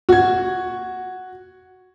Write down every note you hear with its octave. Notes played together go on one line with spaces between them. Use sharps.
F#4 G#6